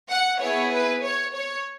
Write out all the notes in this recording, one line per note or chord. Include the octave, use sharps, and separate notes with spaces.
F#5
B3 E4 G#4 C#5
B4
C#5
C#5